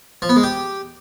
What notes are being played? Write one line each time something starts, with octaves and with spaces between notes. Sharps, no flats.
F3
B3
G#3
G4